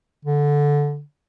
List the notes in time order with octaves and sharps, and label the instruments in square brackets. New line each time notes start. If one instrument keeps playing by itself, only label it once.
[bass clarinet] D3